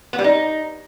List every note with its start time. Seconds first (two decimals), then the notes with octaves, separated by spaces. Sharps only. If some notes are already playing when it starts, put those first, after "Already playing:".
0.13 B3
0.19 G3
0.24 D#4